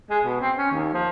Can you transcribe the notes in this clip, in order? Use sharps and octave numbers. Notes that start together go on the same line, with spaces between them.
G#3
B2
C4
C#4
D#2
F3